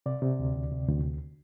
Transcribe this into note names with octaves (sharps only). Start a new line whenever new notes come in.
C3 D5
C3
D2
D2
C3
D2
D2